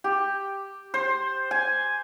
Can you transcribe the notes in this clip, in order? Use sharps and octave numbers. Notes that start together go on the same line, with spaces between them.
G4
C5
G#5